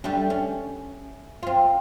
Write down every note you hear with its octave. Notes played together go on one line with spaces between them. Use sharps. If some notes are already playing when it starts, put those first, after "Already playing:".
G3 A3 D4
C#4
C4 F4